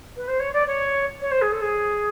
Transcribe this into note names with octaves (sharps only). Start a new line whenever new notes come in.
B4
C5
C#5
D5
C#5
C#5
C5
G#4
A4
G#4